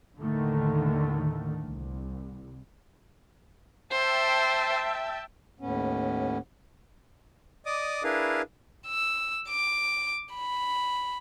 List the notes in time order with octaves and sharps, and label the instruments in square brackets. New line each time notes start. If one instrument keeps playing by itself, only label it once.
[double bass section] D#2 A2 D3 D#3 A3
C2
[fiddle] C5 [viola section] E5 G5 A5
[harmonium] D#2 A2 B3 C#4
[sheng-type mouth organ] D5 D#5 D6 D#6
D4 E4 G#4 A#4 B4 F5
[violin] E6
D6
B5